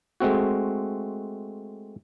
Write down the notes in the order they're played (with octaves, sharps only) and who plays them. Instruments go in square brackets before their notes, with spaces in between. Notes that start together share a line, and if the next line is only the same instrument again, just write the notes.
[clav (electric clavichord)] G#3 A3 C4 F#4